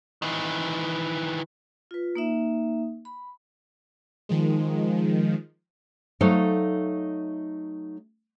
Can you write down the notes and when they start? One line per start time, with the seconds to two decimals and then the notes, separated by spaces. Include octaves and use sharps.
0.22 D#3 E3
1.91 F4 B4
2.15 A#3 D#4 E5
3.05 B5
4.29 D#3 F3 G#3
6.21 F#3 A3 D#4 A4 C5 F5